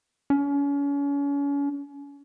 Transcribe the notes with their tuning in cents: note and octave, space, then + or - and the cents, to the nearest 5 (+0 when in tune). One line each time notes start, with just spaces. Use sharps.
C#4 +35